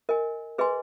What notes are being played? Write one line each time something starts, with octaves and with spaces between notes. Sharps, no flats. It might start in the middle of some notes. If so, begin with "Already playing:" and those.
A#4 D#5 G#5
G#4 B4 D#5 G#5 C6